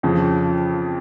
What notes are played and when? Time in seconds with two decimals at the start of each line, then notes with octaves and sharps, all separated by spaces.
0.03 F2 C#3 F3